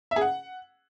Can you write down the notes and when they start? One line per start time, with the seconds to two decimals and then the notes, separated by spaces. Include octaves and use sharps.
0.11 E5
0.16 G#4
0.21 F#5